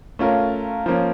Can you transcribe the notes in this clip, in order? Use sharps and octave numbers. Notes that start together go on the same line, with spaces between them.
A3 C#4 F4 A#4
F3 A#3 C#4